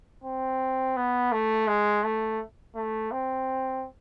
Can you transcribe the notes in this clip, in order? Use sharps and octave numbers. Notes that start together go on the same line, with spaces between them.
C4
B3
A3
G#3
A3
A3
C4